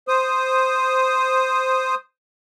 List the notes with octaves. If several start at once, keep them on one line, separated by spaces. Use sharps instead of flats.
C5 D#6